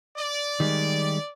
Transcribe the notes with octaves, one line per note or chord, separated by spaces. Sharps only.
D5
D#3 G3 G#3